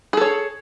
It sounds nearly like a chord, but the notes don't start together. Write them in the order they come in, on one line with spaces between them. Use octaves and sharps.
G#4 A4 C#5